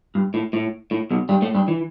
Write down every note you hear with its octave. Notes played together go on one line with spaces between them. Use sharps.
G2
A2
A2
A2
B1 B2
G2 G3
A2 A3
G2 G3
E3